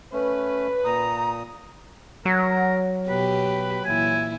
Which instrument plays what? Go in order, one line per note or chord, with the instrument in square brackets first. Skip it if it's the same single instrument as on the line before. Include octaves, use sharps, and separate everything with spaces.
[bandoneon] A3 C#4 [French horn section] B4
[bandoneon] A#2 D#6 [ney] A#5
[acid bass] F#3 [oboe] A#4
[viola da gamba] B2 G4 [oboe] B4
[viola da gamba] A#2 E3 E4 [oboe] G#5